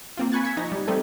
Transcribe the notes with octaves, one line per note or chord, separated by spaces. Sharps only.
A#3 C4 F4
G#5 B5 C#6 F#6 G#6 A6
E6 G#6 B6 C#7
F3 D#4 A#6
G3
G3 A3 C4 D#4 A4